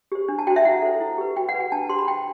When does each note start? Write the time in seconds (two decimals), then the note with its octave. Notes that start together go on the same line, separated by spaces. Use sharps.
0.12 G4 C5
0.29 D4
0.39 A5
0.47 F#4 G5
0.50 C5
0.56 E5
0.65 E4 F#5
0.82 A4 C5
1.00 E4
1.18 G4 B4
1.37 F#4 G5
1.49 F#5
1.54 B4
1.60 G5
1.72 D4 A5
1.89 G4 C5 C6
1.99 B5
2.08 D4 G5